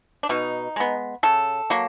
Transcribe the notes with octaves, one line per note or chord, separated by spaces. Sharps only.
D4
B2 D#4
G#3 B3
C#3 A4
F#3 A#3